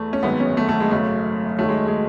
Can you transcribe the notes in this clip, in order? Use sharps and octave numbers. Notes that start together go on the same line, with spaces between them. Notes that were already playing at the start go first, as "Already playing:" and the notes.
Already playing: E2 A3
C#4
G#1 F#2 D#3 G#3 B3
C#4
A3
A3
G#3
G#1 F#2 C#3 A3
D#2 D#3 F#3 A3
G#3
G#3